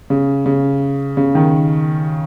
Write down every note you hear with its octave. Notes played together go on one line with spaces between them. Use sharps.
C#3
C#3
C#3
D#3